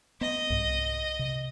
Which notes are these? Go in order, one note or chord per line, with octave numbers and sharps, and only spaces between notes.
B3 D#5
C2 G#2
C3